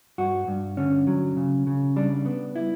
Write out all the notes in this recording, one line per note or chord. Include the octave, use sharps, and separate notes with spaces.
G2 F#4
G2
D3 C#4
F#3
C#3
C#3
G3 D4
B3
E4